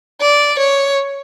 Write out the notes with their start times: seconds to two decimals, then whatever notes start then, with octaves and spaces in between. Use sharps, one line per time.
0.21 D5
0.59 C#5